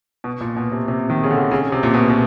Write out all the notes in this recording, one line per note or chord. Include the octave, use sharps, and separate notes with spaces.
B2
A#2
B2
C3
C3
D#3
C#3
D3
C#3
C3
A#2
B2
B2